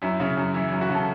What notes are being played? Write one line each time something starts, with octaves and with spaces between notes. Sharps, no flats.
F#2 E4
C#3
F#2
E3 E4
F#2 E4
F#4
C#3
A4